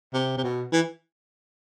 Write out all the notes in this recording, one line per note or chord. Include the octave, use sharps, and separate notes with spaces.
C3
C3
B2
E3